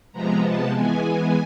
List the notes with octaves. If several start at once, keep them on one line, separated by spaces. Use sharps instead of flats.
C3 F3 G#3 B3 A#5
A5
E3 G#3 B3 G#5